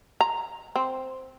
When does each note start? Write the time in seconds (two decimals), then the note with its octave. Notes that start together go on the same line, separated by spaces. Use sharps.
0.21 A#5
0.76 C4